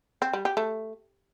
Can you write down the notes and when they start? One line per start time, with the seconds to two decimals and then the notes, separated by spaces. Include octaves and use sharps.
0.22 C4
0.33 G3
0.45 G4
0.57 A3